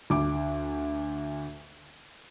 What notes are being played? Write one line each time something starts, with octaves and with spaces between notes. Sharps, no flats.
D2 D6